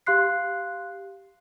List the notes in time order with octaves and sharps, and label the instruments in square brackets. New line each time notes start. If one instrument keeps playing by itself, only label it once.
[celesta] G4 F5 C6 F#6 C7